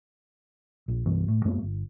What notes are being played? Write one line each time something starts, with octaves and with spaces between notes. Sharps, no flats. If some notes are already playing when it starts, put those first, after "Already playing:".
A#1
C2 G2 E3 B3
A2
F#2 G#3 A#3 B3
G1